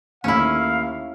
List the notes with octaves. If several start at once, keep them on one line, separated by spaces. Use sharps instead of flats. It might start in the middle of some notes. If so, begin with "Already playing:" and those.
D#2 A3 A#3 C#4 E4 F5